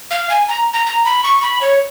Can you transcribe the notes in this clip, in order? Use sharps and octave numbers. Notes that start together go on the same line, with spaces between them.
F5
G#5
A#5
A#5
A#5
B5
C#6
B5
C#5